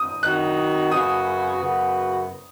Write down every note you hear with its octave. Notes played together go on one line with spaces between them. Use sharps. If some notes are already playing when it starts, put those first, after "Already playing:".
Already playing: D#6
D#3 F#3 D#4 F#4 F#6
F#2 C#3 B3 F#4 D#6
F#2 C#3 B3 F#4